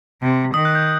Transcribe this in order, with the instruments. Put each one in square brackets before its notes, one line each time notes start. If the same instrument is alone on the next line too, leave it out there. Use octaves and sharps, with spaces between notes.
[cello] C3
[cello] D#3 [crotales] D#6
[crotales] F#6
G6